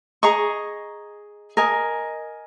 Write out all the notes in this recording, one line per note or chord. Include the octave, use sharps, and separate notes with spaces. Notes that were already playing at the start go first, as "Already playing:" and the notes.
G#4 D#5 A#5 C#6
A#4 D#5 G#5